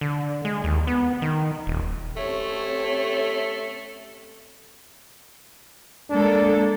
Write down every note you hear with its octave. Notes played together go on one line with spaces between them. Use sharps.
D3
G#3
D#2
B3
D#3
D#1
A3 C4 C#4 G4 A4 C#5
G#3 A#3 D4 A4